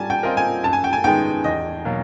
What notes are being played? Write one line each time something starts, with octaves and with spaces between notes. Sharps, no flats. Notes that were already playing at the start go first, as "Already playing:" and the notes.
Already playing: G3 G#5 A5
G5
C4 F4 A#4 D#5
G#5
F#2 A5
G#5
G5
G#5
D#3 G#3 B3 D#4 G5
E2 D#5
B2 F#3 A#3